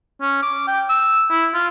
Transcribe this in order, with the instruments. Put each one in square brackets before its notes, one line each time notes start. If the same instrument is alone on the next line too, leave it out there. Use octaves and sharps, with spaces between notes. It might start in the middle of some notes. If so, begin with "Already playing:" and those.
[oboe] C#4
D6
G5
E6
E4
F4